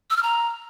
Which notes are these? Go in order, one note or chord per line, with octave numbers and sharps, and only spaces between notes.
E6
F6
A#5